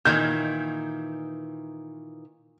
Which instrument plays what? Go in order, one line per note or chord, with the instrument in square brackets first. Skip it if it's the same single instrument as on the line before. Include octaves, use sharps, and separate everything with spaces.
[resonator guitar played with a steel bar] A#2 D#3 E3 [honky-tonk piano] G6 G#6